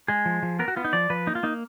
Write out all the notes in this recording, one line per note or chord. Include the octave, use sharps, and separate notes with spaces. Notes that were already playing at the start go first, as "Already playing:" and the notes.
G#3 G#4
F3
F3
B3 A#4
F#4
B3 F4
D#4
F3 D5
F3 B4
A#3 D#4
F4
A#3 D#4